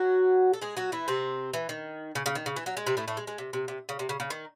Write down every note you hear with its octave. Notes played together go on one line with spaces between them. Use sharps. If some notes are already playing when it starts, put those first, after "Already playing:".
Already playing: F#3 F#4
A4
G#3 G#4
F#3 F#4
E3 E4
C3 C4
E3
D#3
C#3
C#3
D#3
C#3
E3
F#3
G#3
C3 C4
A2 A3
A2 A3
G#3
G#3
C3
C3
C3
C#3
C3
C#3
C#3
D#3